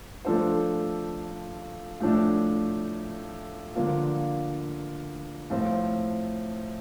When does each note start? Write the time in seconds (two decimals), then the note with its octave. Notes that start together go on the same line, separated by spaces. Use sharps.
0.25 F3 A3 D4 A4 C5
2.00 A2 F3 A3 D4
3.75 D3 F3 A#3 D4 F4
5.50 A2 F3 C4 F4 C5